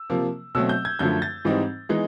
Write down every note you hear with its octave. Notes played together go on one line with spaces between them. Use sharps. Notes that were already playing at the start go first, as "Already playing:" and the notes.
Already playing: E6
C3 F3 A#3
B2 F#3 A3 C4 E6
G6
G#6
F#2 D3 F3 A3 G6
A6
G#2 E3 G3 C4 D#4
E3 G#3 B3 D#4